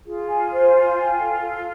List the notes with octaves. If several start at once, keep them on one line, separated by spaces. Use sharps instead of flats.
F4 G#4
G#5
C5
G#5
G5
A4
A4